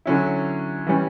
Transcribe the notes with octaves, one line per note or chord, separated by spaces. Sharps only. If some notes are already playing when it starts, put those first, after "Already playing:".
D3 F#3 C#4 E4
E3 G3 C#4